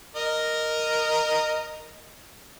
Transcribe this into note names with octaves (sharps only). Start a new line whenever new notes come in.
A#4 D#5